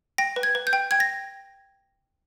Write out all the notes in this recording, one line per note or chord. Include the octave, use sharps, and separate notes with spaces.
G5 A#6
B4
G#6
B4
G6
G5
G5 G#6
A#6